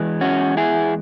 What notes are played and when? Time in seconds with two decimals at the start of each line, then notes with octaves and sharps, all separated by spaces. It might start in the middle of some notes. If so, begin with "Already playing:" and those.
Already playing: E2 E3 G#3
0.21 C#4 F#4
0.57 E4 G#4